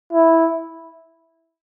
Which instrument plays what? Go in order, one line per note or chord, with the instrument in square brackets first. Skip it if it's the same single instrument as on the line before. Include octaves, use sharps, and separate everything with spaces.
[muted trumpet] E4